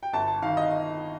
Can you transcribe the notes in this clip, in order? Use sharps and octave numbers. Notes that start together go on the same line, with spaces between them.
G5
G1 A5
A5
D#3 F5
D#5